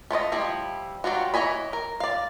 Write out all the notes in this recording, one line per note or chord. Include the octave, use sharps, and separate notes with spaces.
A3 F4 C#5 D#5
F3 G3 E4
F#3 G3 F4 F#4
E3 C#5 D#5 G#5 B5
A#4
D5 F5